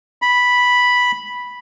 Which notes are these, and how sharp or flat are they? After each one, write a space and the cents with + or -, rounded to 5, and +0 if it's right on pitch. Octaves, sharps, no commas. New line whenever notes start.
B5 -5